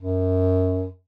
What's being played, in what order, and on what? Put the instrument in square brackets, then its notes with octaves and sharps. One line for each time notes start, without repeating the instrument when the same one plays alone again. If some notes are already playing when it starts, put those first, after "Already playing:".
[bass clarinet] F#2